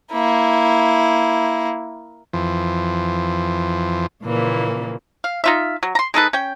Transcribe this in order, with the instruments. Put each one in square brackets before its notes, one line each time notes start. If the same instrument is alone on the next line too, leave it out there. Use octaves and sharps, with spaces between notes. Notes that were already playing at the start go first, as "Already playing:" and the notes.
[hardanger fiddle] A#3 E4
[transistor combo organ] F2 E3 F3
[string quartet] A#2 C#3 E3 F3 A#3
[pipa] F5
D#4 F4 E5
F#3
A#5 C6
G#3 D#4 A4 B4
C#4 G5